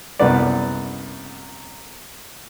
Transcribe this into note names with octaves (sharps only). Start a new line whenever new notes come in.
C2 F#2 C#3 B3 B4 D5